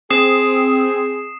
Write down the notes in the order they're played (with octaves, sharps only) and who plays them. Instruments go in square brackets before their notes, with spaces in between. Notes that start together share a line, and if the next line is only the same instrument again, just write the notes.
[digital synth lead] C4 [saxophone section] G#4 [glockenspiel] D#6 C7 E7